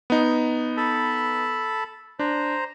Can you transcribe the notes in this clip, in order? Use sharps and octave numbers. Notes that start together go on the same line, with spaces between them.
B3 D#4
A4 A5 B5
D4 C5 A#5